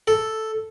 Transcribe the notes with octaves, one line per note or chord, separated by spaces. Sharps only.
A4